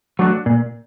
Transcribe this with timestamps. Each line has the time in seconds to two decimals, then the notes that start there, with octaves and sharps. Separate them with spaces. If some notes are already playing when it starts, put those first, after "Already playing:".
0.19 F#3 A3 D4 F#4
0.46 A#2